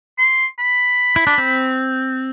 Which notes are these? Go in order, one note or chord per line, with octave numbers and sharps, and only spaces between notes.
C6
B5
E4
D4
C4